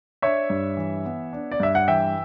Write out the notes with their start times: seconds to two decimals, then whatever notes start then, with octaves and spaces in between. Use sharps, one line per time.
0.22 D4 C#5 E5
0.50 G2
0.77 E3
1.05 B3
1.33 D4
1.51 D5
1.60 G2 E5
1.75 F#5
1.88 E3 E5 G5